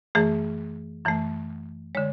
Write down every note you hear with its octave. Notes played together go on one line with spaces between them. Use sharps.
F#2 E3 A3 G#4
F#2 E3 A3
D3 G#3 C#5